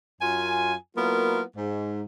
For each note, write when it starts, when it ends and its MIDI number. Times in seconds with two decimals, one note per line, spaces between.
0.21 0.74 42
0.21 0.74 65
0.21 0.74 80
0.96 1.41 54
0.96 1.41 58
0.96 1.41 59
0.96 1.41 64
0.96 1.41 65
0.96 1.41 70
1.56 2.02 44